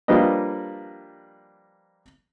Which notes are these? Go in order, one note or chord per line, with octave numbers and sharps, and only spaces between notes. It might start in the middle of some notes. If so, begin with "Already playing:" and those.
F3 G3 A#3 D4 B4 D#5